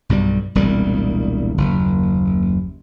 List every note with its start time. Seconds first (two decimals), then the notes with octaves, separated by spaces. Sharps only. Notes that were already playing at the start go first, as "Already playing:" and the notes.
0.09 B1 G2 B2 G3
0.55 E1 C2 A#2 G3
1.58 F#1 D#2